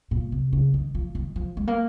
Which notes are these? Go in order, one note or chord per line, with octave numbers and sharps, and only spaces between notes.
A#2
C3
C#3
D#3
F3
D#3
F3
G#3
A#3